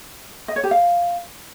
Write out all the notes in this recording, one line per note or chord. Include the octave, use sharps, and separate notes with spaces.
D#5
C#5
G4
F5